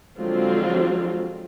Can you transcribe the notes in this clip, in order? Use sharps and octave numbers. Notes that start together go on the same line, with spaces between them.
D3 F3 F#3 G#3 C4 F4